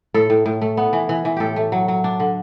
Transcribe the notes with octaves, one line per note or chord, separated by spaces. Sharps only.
A2 A4
A2
A2
A3
B3
E3
E3
E3
A2 G4 A4
A3
F#3
F#3
D4
D3